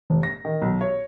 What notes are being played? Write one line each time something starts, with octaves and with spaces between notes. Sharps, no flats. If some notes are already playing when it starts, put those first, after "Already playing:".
F1
A#6
D#3
B1
C#5